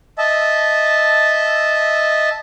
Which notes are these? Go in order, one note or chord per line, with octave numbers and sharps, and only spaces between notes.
D#5 E5 A5